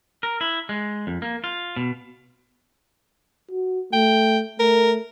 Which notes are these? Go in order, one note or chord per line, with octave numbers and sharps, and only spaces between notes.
A#4
E4
G#3
F2
A#3
F4
B2
F#4
A3 G5
A3 A#4